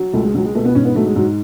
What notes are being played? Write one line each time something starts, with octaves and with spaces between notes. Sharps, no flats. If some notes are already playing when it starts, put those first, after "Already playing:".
Already playing: F#3
C#2 A3
G#3
C#2 F#3
G#3
B2 A3
B3
G#2 C#4
B3
F#3 A3
G#3
G#2 F#3